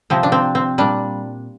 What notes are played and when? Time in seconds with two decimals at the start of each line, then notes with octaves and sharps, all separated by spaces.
0.10 C3 F3 C4
0.23 D4
0.32 C4
0.55 C4
0.78 A#2 G3 D4